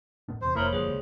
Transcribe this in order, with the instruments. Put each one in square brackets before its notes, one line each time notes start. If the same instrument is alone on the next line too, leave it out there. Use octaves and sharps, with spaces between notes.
[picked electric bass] A2 B3 D4
[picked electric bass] E2 C3 [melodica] C5
[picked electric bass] F1 [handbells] A#3 C5 C#5 [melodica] E4 A#4
[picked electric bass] F#1 D3 F3 [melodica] G3 [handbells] G#4 B4
[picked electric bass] C#2